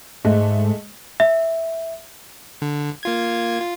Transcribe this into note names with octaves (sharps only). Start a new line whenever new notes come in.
G#2 G#3 A3
E5
D3
A#3 F4 G#6
F4